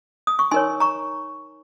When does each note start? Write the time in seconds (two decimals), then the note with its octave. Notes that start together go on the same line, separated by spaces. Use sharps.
0.27 D#6
0.39 C#6
0.51 D#4 A#4 C#5 G#5 C6
0.80 A#5 C#6